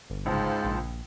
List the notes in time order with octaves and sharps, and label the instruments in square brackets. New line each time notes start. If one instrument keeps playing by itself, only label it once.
[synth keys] G1
[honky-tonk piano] C#2 [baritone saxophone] G#2 [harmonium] F4 C5 A5
[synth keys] A#1